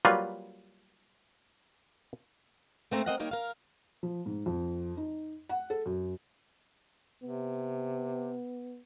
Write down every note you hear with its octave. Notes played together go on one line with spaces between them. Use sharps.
F#3 G3 A#3 F4 B4
G#2 A3 A#3 C4 C5 A#5
C#3 C4 A#4 D#5 F5 F#5
D#3 G3 A#3 D#4 A#4 C#5
A#4 F5
F3
G#2
F2
D#4
F#5
A4
F#2
C3 B3